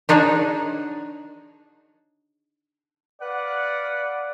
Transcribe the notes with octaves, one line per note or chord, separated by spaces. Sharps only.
D4 D#4 F#4 G#4 C#5
B4 D5 F5 F#5